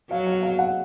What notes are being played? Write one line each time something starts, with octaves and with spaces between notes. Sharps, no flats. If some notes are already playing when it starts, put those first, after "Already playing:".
F#3 F5
F5
F5
F#5